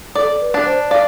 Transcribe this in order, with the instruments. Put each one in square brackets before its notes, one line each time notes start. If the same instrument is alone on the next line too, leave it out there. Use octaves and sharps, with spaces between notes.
[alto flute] A4 [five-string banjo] D5
[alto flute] B4
[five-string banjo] D4
[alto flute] C5
[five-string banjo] D5 [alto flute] F5